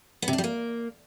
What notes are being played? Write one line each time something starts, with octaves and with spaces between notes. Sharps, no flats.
B3
C3
D4
G3
A#3